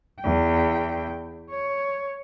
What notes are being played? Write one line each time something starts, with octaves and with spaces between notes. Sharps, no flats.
E2 G5
C#5